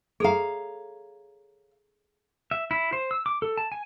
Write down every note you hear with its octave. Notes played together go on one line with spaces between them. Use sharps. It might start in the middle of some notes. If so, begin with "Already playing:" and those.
G#4 A4 C#5 F5 A#5
E5
E4
C5
E6
D6
A4
A5
G#5